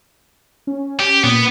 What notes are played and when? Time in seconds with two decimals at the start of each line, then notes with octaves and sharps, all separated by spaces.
0.67 C#4
1.00 G4
1.24 A#2 B3